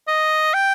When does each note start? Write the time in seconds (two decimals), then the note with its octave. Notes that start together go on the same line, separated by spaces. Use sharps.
0.08 D#5
0.54 G5